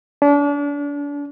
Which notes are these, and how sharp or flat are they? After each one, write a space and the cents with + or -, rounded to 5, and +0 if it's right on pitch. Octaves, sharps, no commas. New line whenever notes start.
D4 -35